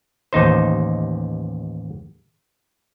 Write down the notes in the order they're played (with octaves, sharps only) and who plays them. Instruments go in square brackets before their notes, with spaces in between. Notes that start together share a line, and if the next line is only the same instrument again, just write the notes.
[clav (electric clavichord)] A1 D#2 D#4 C5